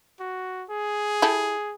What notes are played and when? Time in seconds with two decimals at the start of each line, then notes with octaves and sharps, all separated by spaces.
0.20 F#4
0.70 G#4
1.22 E4 G4 A4